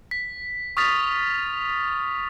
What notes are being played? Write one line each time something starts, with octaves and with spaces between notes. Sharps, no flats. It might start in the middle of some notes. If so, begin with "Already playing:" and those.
B6
C#6 D#6 F6 A6 B6 F7